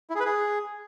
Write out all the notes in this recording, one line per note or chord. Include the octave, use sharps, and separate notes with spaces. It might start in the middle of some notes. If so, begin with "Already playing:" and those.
E4
G#4
B4
G#4